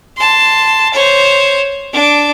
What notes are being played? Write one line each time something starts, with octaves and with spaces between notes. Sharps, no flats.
A5 C6
C5 C#5
D4 D6